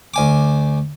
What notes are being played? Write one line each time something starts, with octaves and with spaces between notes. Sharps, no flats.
D2 G#5 D6